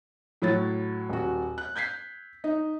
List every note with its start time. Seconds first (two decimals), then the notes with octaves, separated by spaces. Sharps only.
0.42 A2 F#3 C#5 A6
1.09 D#1 F#4
1.58 F#6
1.76 G6 G#6 B6 C7
2.44 D#4